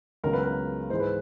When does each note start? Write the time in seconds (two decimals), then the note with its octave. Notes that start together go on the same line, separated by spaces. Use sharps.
0.24 C#2 C#3 F#3 B3 A#4
0.33 B4
0.44 A#4
0.90 G#2 E3 G#3 C5
1.00 B4